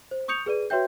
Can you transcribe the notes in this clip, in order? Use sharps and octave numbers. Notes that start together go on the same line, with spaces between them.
C5
C#6 D#6 G6 C#7 F7
G#4 B4 D5 D#7
F#4 B4 C#5 E5 G5 G6